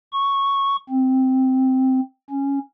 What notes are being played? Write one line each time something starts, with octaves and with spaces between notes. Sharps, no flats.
C#6
C4
C#4